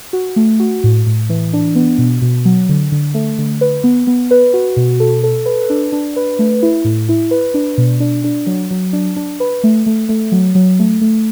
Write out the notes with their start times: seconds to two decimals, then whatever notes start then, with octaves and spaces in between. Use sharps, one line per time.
0.13 F#4
0.36 A3
0.60 F#4
0.84 A2
1.06 A2
1.29 E3
1.53 D4
1.75 B3
1.98 B2
2.22 B2
2.45 F#3
2.69 D3
2.92 D3
3.14 A3
3.38 D3
3.61 B4
3.84 B3
4.07 B3
4.31 B4
4.54 F#4
4.77 B2
5.00 A4
5.24 A4
5.46 B4
5.70 D4
5.92 D4
6.16 B4
6.39 A3
6.62 E4
6.85 A2
7.09 E4
7.31 B4
7.54 D4
7.78 B2
8.00 D4
8.24 D4
8.47 F#3
8.71 F#3
8.93 D4
9.16 D4
9.40 B4
9.64 A3
9.86 A3
10.09 A3
10.32 F#3
10.55 F#3
10.79 A3
11.01 A3